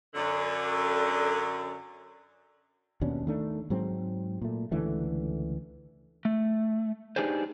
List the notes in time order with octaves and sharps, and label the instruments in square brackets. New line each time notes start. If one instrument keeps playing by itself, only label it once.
[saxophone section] F#2 D3
[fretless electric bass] D#2 B2 C#4 D4
D#3 A3 D4
G#2 F#3 G#3 C4
A#2 A3
C#2 D3 E3 A3
[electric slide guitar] A3
D4 D#4 G4 G#4 B4 C5